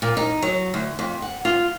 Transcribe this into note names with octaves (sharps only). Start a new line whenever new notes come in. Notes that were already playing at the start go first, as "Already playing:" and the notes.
A#2
D#4
F#3
D2
F2
F#5
F4